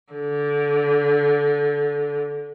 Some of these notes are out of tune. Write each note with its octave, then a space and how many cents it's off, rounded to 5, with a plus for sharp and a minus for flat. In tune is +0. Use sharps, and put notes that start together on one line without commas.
D3 -15